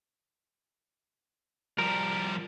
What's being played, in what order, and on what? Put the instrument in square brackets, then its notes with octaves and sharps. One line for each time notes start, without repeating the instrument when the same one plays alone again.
[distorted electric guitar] F3 G3 [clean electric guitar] A#4